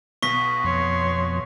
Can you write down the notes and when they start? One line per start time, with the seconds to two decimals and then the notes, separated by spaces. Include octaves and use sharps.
0.22 B1 B2 C#6 A#6 B6
0.64 F2 C#5 C6